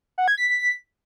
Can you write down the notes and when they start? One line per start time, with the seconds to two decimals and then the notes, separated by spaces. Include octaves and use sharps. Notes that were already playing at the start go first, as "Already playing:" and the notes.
0.18 F#5
0.28 G#6
0.37 B6